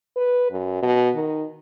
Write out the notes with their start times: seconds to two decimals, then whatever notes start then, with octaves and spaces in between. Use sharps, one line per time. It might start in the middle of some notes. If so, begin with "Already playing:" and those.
0.16 B4
0.51 F#2
0.82 B2
1.15 D#3